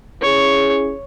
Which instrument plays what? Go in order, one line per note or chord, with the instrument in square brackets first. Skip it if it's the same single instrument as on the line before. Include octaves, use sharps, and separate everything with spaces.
[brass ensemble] C#4 E4 G#4 [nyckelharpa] C#5